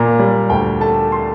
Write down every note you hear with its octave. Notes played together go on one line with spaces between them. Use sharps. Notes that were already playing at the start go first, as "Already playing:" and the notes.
Already playing: A#2 A#3 A#5
G3
D2 G5
A3 A5
C6